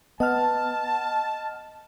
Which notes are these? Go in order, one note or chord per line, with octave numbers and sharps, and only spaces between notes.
B3 D#5 F#5 A5 F6